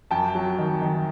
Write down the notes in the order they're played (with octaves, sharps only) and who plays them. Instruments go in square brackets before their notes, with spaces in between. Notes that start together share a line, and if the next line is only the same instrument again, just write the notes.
[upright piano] F#2 G5 A5
F#3
D#3
D#3